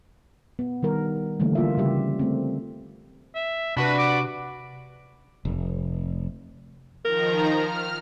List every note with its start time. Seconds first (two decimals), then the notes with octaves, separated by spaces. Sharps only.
0.59 B3
0.83 D#3 G3 A#4
1.40 D3 E3 G3 A3 A#3
1.55 A#3 F4 E5
1.77 C#3 G3 G4 E5
2.19 A3 C4
3.35 E5
3.77 C3 D4 F#4 B4 B5
3.98 D6
5.45 F1
7.05 D#3 F3 A#4 A#5
7.51 F6